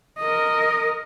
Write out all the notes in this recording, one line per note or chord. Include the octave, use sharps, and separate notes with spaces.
A#4 D#5